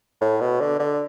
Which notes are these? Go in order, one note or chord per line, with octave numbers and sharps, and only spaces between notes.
A2
B2
D3
D3